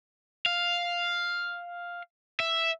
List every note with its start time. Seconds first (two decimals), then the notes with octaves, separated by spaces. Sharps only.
0.46 F5
2.40 E5